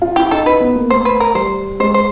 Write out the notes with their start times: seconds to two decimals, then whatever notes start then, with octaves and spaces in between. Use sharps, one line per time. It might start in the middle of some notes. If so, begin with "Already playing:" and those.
0.02 F4
0.16 E4 G4
0.31 D#4 A4
0.46 D#4 B4
0.60 B3
0.75 A#3
0.90 A3 C5
1.05 B4
1.20 A#4
1.35 G3 C5
1.80 G#3 C5
1.94 C5